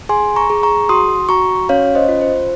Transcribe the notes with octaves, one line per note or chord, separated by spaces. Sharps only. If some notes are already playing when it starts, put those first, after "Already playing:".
G#4 G#5 C6
A#5 C#6
G#4
A#5 C#6
F#4 C6 D#6
F#4 A#5 C#6
C#4 C#5 F5
C5 D#5
F4
C5